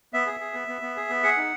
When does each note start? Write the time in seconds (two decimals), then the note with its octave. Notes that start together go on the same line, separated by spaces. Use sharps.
0.13 B3 E5
0.26 G#4
0.40 G#4
0.54 B3
0.68 B3
0.82 B3
0.96 G#4
1.10 B3
1.23 G#4 F#5
1.37 D#4